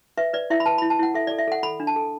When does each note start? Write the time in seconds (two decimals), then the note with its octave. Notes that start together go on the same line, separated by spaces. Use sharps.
0.18 B4 E5
0.33 B4 D5
0.50 E4 E5
0.60 B5
0.66 B4 A5
0.78 E4 B5
0.90 A5
0.99 E4 F#5
1.14 A4 E5
1.27 A4 D5
1.38 E5
1.48 A4 F#5
1.63 A4 B5
1.80 D4
1.87 A5
1.96 A4